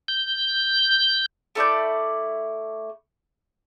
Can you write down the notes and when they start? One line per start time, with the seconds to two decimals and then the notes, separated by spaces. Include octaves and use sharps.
0.08 G6
1.55 A3 E4 D5 G6